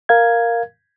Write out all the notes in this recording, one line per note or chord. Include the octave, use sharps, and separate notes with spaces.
A#4 F5 G#6